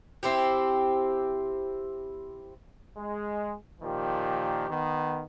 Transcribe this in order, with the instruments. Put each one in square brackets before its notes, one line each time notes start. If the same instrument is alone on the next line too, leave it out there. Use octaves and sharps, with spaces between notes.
[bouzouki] C4 E4 G4
[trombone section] G#3
A#2 D#3 F3 G4
D#3 B3